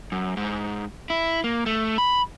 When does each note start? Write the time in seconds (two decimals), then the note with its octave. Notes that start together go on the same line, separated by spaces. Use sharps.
0.12 F#2
0.37 G#2
1.10 E4
1.44 A#3
1.66 A3
1.98 B5